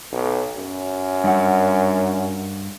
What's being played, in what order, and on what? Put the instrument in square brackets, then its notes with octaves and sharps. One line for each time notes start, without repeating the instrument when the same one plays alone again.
[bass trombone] B1
F#2
[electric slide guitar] G2 F#5